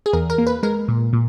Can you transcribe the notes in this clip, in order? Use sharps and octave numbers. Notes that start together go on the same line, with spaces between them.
G#4
E2 A#4
A#4
A#3
B4
G#3 A#4
A#2
A#2